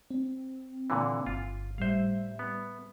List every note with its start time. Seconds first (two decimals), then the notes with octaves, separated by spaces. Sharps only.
0.10 C4
0.90 A#2 D3 E3
1.26 G1 F4
1.78 A2 G3 C5 E5 F5
2.39 B3